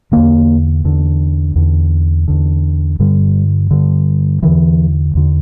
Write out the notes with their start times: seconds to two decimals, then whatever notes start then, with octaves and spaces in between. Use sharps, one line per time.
0.12 E2 D3 A#3
0.84 E2 D3
1.56 E2 D3
2.28 E2 D3
3.00 G2 D3 G3
3.71 G2 D3
4.42 E2 D3 E3
5.15 E2 D3